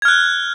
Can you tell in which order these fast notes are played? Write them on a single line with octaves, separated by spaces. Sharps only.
G#6 F6 F#6